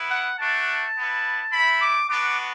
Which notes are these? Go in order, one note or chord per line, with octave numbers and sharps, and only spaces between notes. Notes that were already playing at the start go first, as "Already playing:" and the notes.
Already playing: B3 E4
F#5
A3 D4 F#4 A5
B3 E4
A3 E4 B5
D6
B3 D4 F#4 D6